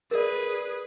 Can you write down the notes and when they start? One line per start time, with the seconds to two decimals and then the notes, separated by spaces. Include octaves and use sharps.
0.11 G#4 A#4 B4 D5